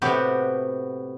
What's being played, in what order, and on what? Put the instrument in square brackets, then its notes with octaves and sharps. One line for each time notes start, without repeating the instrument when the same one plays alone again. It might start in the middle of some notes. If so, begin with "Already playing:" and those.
[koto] A2 C3 B3 F#4 G4